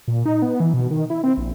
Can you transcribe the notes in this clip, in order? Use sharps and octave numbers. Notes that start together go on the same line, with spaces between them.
A#2
D#4
B3
E3
B2
D#3
E4
C4
A#1